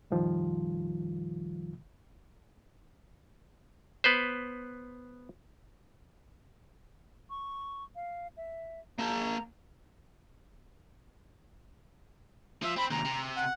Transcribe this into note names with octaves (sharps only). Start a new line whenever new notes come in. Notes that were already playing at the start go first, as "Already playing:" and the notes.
F2 A#2 D#3 F3 G3 F4
B3 B4 C5
C#6
F5
E5
A#3 A5 A#5
F3 E5
C4 B5
D#2 C3 A#5
C3
F#5